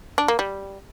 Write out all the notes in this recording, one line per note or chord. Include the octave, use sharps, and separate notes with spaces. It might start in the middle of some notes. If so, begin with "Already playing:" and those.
D4
A#3
G3